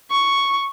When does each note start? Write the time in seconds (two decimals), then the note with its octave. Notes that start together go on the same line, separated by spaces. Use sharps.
0.11 C#6